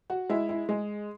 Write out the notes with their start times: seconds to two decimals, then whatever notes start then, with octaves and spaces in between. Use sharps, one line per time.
0.10 F#4 F#5
0.29 G#3 E4 E5
0.49 E4 E5
0.69 G#3 G#4